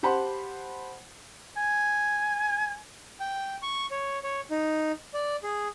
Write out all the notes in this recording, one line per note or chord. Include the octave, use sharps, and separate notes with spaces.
G4 C5 F#5 A5 B5 C6
G#5
G5
C#6
C#5
C#5
D#4
D5
G#4